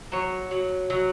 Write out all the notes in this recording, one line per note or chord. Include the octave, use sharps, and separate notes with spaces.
F#3 C#5
F#3
F#3